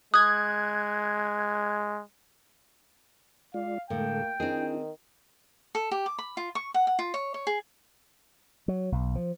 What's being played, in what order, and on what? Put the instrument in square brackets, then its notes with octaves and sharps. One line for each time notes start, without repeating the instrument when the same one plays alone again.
[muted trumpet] G#3 [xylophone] D#6 [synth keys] F#6 G#6
[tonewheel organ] G#3 F4 D5 [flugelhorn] F5
[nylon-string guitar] A2 [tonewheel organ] D3 G#3 A4 [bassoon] A#3 [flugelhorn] G5
[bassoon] D#3 [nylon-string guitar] C4 G#4 [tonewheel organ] D4 E4
[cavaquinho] A4
G4
D6
B5
F4
C#6
F#5
F#5
F4
C#5
C#5
G#4
[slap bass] F#3
B1
F3